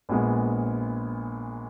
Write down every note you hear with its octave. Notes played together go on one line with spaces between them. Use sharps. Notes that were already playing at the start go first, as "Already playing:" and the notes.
A#1 A#2 G#3 B3